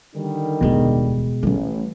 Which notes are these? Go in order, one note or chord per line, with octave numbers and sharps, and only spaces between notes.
D3 D#3 G3
D1 E2 B2 G#3
A1 G3 C#4